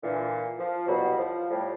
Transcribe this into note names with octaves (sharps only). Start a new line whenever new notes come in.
A#2 D3 E3
F3
C2 B2 F#3 G3 F#4 B5
F3
A2 F3 G3